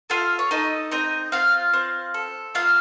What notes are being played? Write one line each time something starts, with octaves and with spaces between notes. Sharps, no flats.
F4 A4 F5
C#5
D#4 A4 D#5
C4 D#4 D#5
C4 F4 F5
C4
A4
A#3 F4 F5